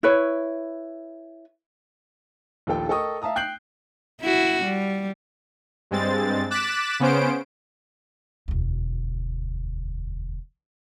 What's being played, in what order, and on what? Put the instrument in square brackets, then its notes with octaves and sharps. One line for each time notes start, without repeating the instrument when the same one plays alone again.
[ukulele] E4 B4 C#5
[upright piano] A#1 D#2 F4 A4 G5
A4 A#4 D#5 G5 C#6 D#6
E5 F5 A5 A#5 D#6
G5 F#6 G6 C7 D7 F#7
[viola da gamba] E4 F#4
G3
[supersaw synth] G2 G#3 C4 A6
D6 F#6 A6 B6 E7
C#3 B3 C#4 C5 D7
[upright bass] E1 D2